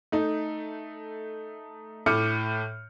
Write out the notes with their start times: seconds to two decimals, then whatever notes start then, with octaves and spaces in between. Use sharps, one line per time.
0.12 A3 D#4
2.06 A2 A3 D6 F6 C#7